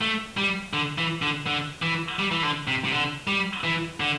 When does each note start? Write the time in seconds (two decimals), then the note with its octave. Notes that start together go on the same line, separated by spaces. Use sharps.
0.01 A3
0.37 G3
0.74 D3
0.98 E3
1.22 D3
1.46 D3
1.82 E3
2.19 G3
2.31 E3
2.43 D3
2.68 C3
2.84 C3
2.92 D3
3.27 G3
3.64 E3
4.00 D3